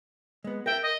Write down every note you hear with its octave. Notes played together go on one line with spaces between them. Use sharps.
G#3 B3
A#4 E5 G5
D#5